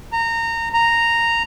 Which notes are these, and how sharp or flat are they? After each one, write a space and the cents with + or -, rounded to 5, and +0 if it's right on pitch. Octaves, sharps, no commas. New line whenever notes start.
A#5 -25
A#5 -10